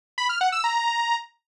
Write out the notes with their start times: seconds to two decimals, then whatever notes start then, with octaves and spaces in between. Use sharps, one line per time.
0.18 B5
0.29 F6
0.41 F#5
0.52 E6
0.64 A#5